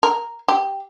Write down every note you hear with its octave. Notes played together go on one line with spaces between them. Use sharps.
A#4
G4